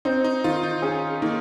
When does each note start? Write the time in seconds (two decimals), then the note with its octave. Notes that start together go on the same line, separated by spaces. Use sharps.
0.05 C4 D#4
0.24 D#4
0.44 D#3 F4
0.63 D#4
0.82 C#4 G#4
1.22 D#3 A#3